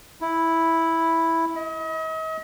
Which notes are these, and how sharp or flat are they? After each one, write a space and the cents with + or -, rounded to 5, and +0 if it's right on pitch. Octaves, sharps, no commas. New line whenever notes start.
E4 -5
D#5 +40